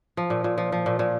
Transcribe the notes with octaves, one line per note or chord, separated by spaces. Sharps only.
F3
A#2
A#2
F3
F3
A#2
A#2